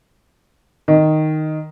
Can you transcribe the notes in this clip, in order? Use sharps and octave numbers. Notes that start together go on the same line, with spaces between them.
D#3